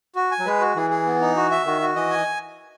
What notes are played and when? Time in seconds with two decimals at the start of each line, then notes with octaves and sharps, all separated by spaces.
0.16 F#4
0.31 G#5
0.39 F#3
0.46 G#3 B4
0.60 F#4
0.76 E3 G#4
0.90 G#4
1.06 B3
1.21 D#4
1.36 F#4
1.51 E5
1.66 D#3 F#4
1.81 F#4
1.96 E3 D#5
2.10 G#5